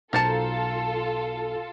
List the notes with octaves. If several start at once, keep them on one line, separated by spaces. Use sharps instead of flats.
B1 F4 A4 A#4 C5 A5 A6 C#7